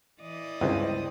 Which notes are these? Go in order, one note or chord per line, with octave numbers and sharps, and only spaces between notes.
E3 D5 D#5
G1 C#2 C4 E4